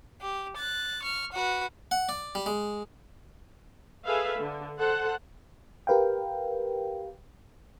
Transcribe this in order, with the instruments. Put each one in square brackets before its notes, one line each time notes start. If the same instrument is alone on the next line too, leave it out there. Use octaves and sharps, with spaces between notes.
[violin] G4
F#6 A6
C#6 F6
F#4 B4
[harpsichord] F#5
D5
G3
G#3
[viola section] G#4 A4 B4 E5 F5
D3
A4 C5 F#5
[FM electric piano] G4 A#4 B4 F5 G5